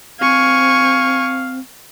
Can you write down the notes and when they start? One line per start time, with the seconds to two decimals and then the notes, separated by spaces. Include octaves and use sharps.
0.21 C4 F5 G#5 C#6